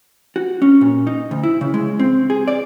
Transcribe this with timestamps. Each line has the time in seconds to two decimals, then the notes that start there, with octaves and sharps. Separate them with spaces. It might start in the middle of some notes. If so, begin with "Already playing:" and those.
0.36 F#4
0.62 C#4
0.81 A#2
1.07 D#4
1.31 D2
1.43 E4
1.61 C#3
1.74 G#3
1.99 C4
2.30 G#4
2.48 D5